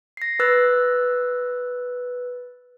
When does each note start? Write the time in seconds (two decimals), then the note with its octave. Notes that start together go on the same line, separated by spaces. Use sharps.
0.17 A#6 C7
0.39 B4 E6 F#6 A6